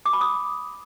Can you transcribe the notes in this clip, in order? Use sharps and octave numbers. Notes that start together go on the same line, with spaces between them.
D6
B5
D#6